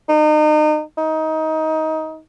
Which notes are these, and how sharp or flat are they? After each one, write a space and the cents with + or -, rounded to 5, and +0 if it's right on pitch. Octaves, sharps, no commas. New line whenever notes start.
D#4 -35
D#4 +20